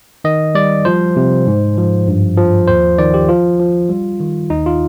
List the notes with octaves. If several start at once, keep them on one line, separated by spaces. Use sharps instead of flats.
D#3 D#5
G3 D5
F3 C5
C3
G#2
F3
G2
F3
D#2 C5
D#3 D5
G4
F3 F4
F3
G3
D#3
D#2 D#4
F4